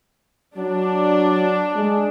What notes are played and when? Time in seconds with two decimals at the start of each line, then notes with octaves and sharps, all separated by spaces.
0.57 F#3 D4
1.76 G#3